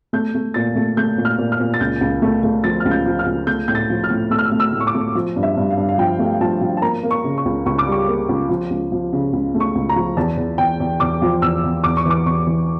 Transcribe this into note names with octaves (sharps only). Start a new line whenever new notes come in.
A3 G6
A3
A#2 A6
A3
A3 G6
A#2
F6
A#2
F6
A#2
A6
C#2 G6
C#2
A3
A3
F3 A6
F6
C#2
G6
F3
F6
C#2
A3 G6
A2 G6
A6
F3
F6
A2
A3 E6
F6
E6
A3
E6
A2
C#6
D6
A3
F3
G2
E5
G2
F5
G2
F5
F3 G5
A3
F3 A5
F3
A5
A#3 A#5
A#3
C#6
C#3
C#6
C#2
C#2 C#6
D6
G3 C#6
A#3
C#2
F3
C#2
F3
C#3
C#2
A3
C#6
C#2
A#5
F3
E2 A5
E2
E2 G5
E2
E2 D6
F3
E2 E6
E2
E2 D6
C#6
E3 D6
E2 C#6
E3